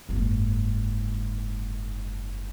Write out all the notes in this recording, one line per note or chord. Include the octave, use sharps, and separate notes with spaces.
F#1 G#2